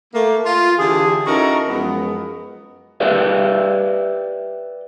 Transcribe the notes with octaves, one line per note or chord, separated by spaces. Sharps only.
A3 A#3
F4
D3 E3 G4 G#4
C#4 D#4 E4 F#4 A4 A#4
F#2 F3 G#3 B3
G4 B4 D5 E5